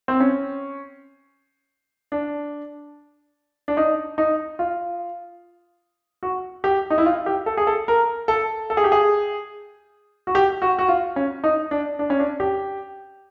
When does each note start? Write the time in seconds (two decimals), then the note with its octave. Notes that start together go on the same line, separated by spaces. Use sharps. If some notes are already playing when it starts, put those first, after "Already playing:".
0.08 C4
0.20 C#4
2.12 D4
3.68 D4
3.77 D#4
4.18 D#4
4.59 F4
6.23 F#4
6.64 G4
6.90 D#4
6.98 E4
7.06 F4
7.26 G4
7.46 A4
7.57 G#4
7.67 A4
7.88 A#4
8.28 A4
8.70 A4
8.77 G#4
8.84 G4
8.92 G#4
10.27 F#4
10.35 G4
10.62 F#4
10.79 F#4
10.89 F4
11.16 C#4
11.44 D#4
11.71 D4
11.99 D4
12.10 C#4
12.19 D4
12.40 G4